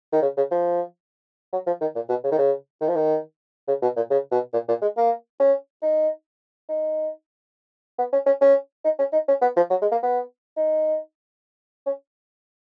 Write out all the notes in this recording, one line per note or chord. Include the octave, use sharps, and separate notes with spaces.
D#3
C#3
C#3
F3
F#3
F3
D#3
A#2
B2
C#3
D#3
C#3
D#3
F3
D#3
C#3
B2
A#2
C#3
B2
A#2
A#2
G#3
A#3
C#4
D#4
D#4
B3
C#4
C#4
C#4
D#4
C#4
D#4
C#4
B3
F3
F#3
G#3
A#3
B3
D#4
C#4